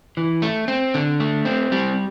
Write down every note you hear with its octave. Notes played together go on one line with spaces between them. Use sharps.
E3
A3
C4
D3
A3
C4
G3